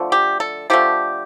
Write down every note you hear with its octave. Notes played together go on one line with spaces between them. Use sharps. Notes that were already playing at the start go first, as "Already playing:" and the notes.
Already playing: D3 F3 A3
G4
A4
D3 F3 A3 G4